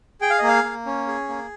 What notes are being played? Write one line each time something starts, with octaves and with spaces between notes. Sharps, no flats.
G#4 G5
F5
D#5
A#3
F5
A#3
C#4
G#4
A#3